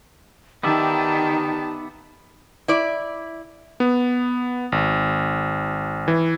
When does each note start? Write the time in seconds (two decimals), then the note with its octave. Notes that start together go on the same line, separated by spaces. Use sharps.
0.63 D#3 B3 D#4 G4 D5 E5 A5
2.68 E4 D5
3.80 B3
4.72 G#1
6.08 E3